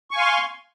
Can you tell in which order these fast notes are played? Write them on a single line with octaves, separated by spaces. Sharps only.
C#6 G#5 F5 C6